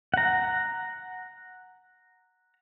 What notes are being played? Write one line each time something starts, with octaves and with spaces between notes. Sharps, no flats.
F#5 A#5